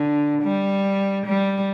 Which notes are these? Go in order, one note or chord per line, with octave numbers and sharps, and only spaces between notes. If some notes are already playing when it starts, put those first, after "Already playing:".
Already playing: D3
G3
G3